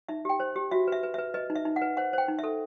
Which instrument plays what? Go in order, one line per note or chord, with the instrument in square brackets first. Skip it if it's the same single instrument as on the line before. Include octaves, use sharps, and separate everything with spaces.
[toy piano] D#4 E5
G4 G5
C5
G4
F#4 E5
B4 E5
B4
E5
B4
B4 D#5
D#4
E5
D#4
F#5
B4
C5 F#5
C5 G5
D#4
A4 E5